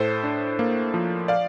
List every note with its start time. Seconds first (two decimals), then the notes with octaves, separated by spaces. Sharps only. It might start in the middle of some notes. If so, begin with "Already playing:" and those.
Already playing: A2 A4 C5
0.24 D4
0.59 A#3
0.94 F3
1.28 D5 F5